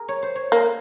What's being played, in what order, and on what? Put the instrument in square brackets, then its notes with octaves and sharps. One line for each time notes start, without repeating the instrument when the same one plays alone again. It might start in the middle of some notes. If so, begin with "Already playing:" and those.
Already playing: [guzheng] G#4 A#4
C#5
C5
C#5
[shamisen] A#3